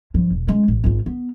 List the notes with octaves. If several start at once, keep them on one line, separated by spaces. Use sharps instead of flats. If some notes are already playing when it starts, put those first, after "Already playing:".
G2 F3
E1
G#3 C#4
A1
G#1 F4
B3